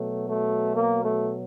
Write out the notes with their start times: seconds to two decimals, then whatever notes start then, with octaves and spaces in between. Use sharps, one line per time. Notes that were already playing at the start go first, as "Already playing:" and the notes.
Already playing: B2 F#3 A3
0.29 A3
0.73 A#3
1.03 A3